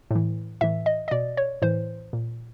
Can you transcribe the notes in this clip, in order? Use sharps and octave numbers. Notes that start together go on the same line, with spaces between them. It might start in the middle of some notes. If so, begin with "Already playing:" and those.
A2 E3
A2 E3 E5
D#5
D#5
B2 D5
C#5
A2 E3 C5
A#2